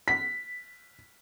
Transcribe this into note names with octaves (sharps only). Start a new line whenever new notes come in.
B6